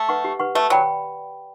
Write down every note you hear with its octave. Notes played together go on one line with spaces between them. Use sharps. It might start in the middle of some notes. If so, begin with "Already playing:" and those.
Already playing: A3
B4 F#5 C#6
G4
B4 F#5 C#6
A3 B4
F#3 D5 G5 B5